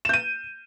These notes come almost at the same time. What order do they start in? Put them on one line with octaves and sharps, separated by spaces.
E7 G6 D#7